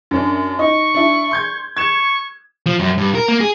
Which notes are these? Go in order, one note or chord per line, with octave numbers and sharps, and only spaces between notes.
F#2 C#4 D4
D#4 C#6
D4 E4
C6 G6 G#6
C#6 G#6 E7
F3
F#2
G2
A#4
A#3
G#4